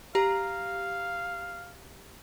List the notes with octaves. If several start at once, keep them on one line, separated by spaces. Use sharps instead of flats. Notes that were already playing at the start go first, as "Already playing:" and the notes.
G4 F5 A#5